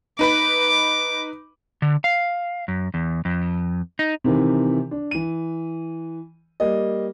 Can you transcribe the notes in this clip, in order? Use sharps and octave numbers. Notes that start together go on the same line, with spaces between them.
D#4 B4 B5 D6
D3
F5
F#2
E2
F2
D#4
C3 D#3 E3
D4
E3 D#7
G3 A#3 D#5